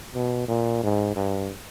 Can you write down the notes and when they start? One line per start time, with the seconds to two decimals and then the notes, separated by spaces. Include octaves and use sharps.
0.15 B2
0.48 A#2
0.83 G#2
1.16 G2